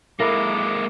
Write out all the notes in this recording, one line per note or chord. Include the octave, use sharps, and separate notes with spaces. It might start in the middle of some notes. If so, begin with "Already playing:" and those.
G#3 A#3 E4 A4 A#4 D6